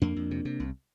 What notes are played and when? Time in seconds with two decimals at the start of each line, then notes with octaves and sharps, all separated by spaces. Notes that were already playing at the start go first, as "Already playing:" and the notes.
0.02 F2 A#3 D4
0.16 F2
0.31 C3
0.45 C3
0.60 C2